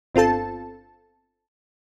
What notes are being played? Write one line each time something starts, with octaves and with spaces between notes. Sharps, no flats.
G1 C4 F4 A4 A5